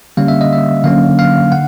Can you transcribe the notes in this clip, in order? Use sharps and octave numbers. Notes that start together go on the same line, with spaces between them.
D3 G3 A#3 C#4 F5
E5
D#5
E5
D3 F#3 A#3 C#4 F5
F5
D3 F#5